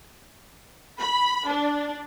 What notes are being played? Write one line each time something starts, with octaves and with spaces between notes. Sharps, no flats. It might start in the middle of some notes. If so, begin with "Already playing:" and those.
B5
D4